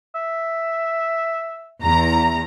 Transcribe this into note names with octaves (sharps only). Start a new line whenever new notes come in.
E5
E2 A#5